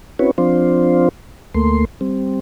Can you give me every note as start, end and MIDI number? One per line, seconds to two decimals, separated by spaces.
0.19 0.31 60
0.19 0.31 61
0.19 0.31 64
0.19 0.31 66
0.19 0.31 71
0.19 0.31 73
0.38 1.09 53
0.38 1.09 60
0.38 1.09 62
0.38 1.09 65
0.38 1.09 72
1.54 1.85 38
1.54 1.85 57
1.54 1.85 58
1.54 1.85 84
2.01 2.40 55
2.01 2.40 60